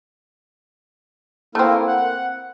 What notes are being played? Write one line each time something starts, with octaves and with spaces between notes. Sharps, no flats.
A3 A#3 C4 E4 A#4
F#5